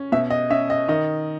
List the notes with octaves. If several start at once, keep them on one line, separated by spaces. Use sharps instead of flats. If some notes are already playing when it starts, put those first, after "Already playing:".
Already playing: C#4
B2 E5
D#5
C#4 E5
D#5
D#3 D#5